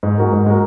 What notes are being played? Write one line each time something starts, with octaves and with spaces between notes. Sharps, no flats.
G#2
G#3 F#4 A#4
G#2
G#3 F#4 A#4